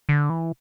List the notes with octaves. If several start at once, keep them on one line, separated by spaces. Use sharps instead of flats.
D3
E3